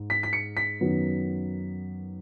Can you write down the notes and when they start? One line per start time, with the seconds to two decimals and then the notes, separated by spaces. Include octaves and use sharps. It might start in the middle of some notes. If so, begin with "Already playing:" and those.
Already playing: G#2
0.10 B6
0.23 B6
0.33 C#7
0.57 B6
0.81 F#2 D#3 F#3 B3